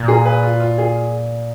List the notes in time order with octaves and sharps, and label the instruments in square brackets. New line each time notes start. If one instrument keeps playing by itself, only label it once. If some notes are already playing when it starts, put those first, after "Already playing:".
Already playing: [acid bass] A#2
[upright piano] G#4
B4
F4
F4
G#4